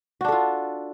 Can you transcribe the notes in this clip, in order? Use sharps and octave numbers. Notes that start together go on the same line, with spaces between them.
D4 F4 F#4 A4